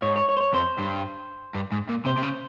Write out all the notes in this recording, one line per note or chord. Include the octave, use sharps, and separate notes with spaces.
G#2 C#5
C#5
C#5
C5
C#5
F2 C5
G2
G2
G#2
A#2
C3 C5
C3
C#3